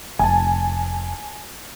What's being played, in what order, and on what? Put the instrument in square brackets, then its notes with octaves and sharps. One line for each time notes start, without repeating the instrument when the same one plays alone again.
[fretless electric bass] F1 [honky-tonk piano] G#5 A5